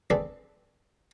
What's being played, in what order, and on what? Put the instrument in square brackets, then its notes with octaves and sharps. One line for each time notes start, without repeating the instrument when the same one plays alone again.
[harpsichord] C4 D4 G#4 A4 B4